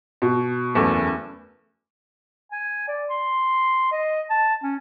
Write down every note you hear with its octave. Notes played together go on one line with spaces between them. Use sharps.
B2
F#1 E2 A3
G#5
D5
C6
D#5
A5
C#4